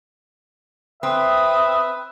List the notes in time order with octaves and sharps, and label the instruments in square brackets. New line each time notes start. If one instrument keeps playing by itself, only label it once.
[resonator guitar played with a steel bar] C4 [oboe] B4 [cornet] E5 [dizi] D#6